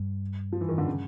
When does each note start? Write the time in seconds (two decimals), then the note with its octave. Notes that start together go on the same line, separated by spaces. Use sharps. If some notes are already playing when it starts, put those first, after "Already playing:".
Already playing: G2
0.52 F3
0.61 E3
0.69 D#3
0.78 D3
0.87 C#3